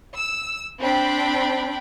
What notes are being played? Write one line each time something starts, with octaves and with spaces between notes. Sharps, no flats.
E6
C4 D4 G5 B5